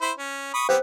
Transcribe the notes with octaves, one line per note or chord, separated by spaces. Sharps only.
E4 C5 B5
C#4
B5 C#6 D#6
B3 C4 G4 C5